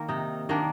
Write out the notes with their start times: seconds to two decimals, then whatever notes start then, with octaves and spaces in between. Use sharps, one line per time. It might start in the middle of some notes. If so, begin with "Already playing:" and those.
Already playing: D#3 A#3 A#4
0.09 C3 D#4
0.49 D#3 A#3 D4